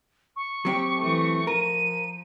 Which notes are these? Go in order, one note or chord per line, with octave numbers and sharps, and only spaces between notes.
C#6
F#3 C4 G4
E3 A3
F3 A#4 D#7